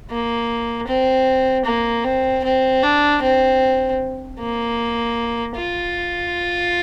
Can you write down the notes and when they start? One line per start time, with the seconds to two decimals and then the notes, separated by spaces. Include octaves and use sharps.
0.10 A#3
0.88 C4
1.66 A#3
2.05 C4
2.44 C4
2.83 D4
3.22 C4
4.40 A#3
5.56 F4